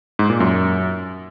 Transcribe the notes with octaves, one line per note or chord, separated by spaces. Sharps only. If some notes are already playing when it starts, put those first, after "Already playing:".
G#2
A#2
F#2